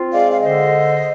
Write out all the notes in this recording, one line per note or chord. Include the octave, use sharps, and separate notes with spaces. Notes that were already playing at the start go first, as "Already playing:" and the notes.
Already playing: C4 F4
G#3 D5 F5
F5
D3 C5 D#5